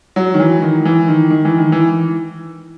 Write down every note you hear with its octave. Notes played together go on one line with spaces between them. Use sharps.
F#3
D#3
E3
D#3
E3
D#3
D#3
E3
D#3
E3